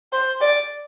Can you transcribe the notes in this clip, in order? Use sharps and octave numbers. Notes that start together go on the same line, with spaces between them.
C5
D5